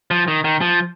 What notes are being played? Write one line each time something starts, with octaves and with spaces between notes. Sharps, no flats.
F3
D#3
D#3
F3